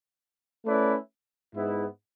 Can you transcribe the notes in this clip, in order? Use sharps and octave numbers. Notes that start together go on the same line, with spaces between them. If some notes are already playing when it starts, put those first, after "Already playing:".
A3 C#4 E4 B4 D5
G#2 G#3 B3 E4